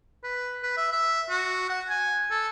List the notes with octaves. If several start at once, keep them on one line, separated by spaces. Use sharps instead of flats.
B4
B4
E5
E5
F#4
F#5
G#5
A4